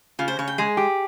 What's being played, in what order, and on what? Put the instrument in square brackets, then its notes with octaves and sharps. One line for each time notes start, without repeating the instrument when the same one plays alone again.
[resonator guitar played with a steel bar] C#3 [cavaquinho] F4
[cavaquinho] C5
[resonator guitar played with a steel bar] C#3 [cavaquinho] C#5
[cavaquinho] G5
[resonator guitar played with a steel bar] G#3 [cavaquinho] G#4
[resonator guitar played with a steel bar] G4